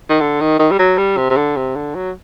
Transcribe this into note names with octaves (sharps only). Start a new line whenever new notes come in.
D#3
D3
D#3
D#3
G3
F#3
G3
C3
C3
D3
C3
D3
F#3